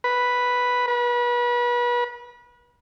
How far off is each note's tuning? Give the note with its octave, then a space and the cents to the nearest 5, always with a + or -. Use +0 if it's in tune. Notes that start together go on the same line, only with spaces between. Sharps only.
B4 -5
B4 -35